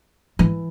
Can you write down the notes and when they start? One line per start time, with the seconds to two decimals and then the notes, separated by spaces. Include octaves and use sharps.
0.39 E3